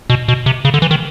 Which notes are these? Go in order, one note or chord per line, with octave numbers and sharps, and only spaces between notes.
B2
B2
C3
C#3
D3
E3
D#3